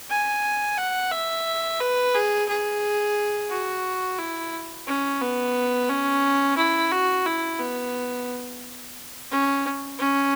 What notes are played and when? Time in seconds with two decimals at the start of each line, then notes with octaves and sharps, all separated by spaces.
0.10 G#5
0.78 F#5
1.12 E5
1.80 B4
2.15 G#4
2.49 G#4
3.50 F#4
4.19 E4
4.87 C#4
5.21 B3
5.90 C#4
6.57 E4
6.92 F#4
7.26 E4
7.60 B3
9.31 C#4
9.99 C#4